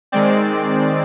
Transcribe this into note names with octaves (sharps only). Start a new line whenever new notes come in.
D#3 G#3 C4 D5